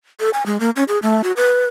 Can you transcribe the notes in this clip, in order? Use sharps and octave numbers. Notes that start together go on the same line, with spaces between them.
A4
G#5
G#3
A#3
C#4
G#4
A3
F#4
B4